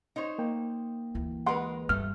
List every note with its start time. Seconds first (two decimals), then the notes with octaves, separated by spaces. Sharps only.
0.16 D#4 C5 C#5
0.39 A#3 G5
1.14 D2 E3
1.46 G#3 A#4 B4 F#5 C6
1.89 G2 A3 F6